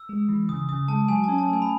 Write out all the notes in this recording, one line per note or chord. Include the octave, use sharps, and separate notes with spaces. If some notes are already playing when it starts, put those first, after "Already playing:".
Already playing: E6
G#3
E3
C#3 D#6
C#3 D#6
G#3 A5
F#3 G#5
C#4 A5
A5
A3
G#5
B5